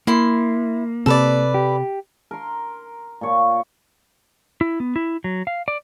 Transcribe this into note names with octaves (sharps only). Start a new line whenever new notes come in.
A#3 E4 C6
C3 C4 A4 B4 D5
G4
A#4 C6
A#2 C#5
E4
B3
E4
F#3
F5
D5